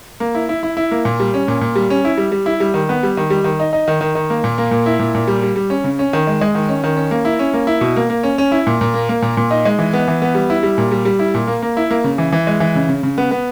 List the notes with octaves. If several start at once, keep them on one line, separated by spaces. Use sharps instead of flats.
A#3
E4
E4
E4
E4
A#3
A#2
G3
C#4
A#2
A#2
G3
C#4
E4
G3
G3
E4
G3
D#3
B3
G3
D#3
G3
D#3
D#4
D#4
D#3
D#3
D#3
A#3
A#2
A#3
A#2
E4
A#2
A#2
G3
G3
G3
C#4
C#3
C#4
D#3
G#3
G#3
D#3
C#4
D#3
C#4
A#3
E4
C#4
A#3
E4
B2
A#3
A#3
C#4
C#4
E4
A#2
A#2
A#3
A#3
A#2
A#2
D#4
G#3
E3
B3
E3
B3
G3
E4
G3
A#2
G3
G3
E4
A#2
A#3
A#3
E4
A#3
C#3
E3
E3
G#3
E3
C#3
C#3
C#3
B3
B3